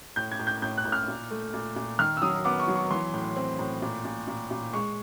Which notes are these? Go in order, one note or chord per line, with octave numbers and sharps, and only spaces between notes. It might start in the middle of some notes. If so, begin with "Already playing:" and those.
A2 G6
G#6
A2
G6
A2 G6
F#6
A2
F6
A#2
A3
A#2
A#2
D#3 F6
E6
F#3 D#6
B3 D6
C#6
F#3
C#6
E3 C6
A2
C4
A2
A#2
A#2
A#2
A#2
G#3 C#6